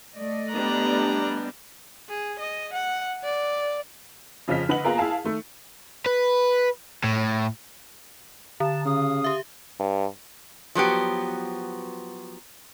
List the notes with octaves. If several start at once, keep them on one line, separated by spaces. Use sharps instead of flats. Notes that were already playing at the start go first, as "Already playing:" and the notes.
A3 D5 D#5
G3 B3 D4 A#5 F#6
G#4
D#5
F#5
D5
F2 C#3 F3 D#5 F6 B6
D3 B4 D#5 F#5 F#7
A#3 B3 F4 G#4 A#4
E4 G#4 F5 A5
D#3 A3
B4
A2
D3 A5
C#3 F5 D#6
G4 E5
G2
F3 F#3 B3 G4